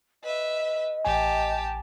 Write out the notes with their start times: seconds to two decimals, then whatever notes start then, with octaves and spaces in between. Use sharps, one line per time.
0.24 B4 D#5 E5
1.05 A1 G4 G#5 A5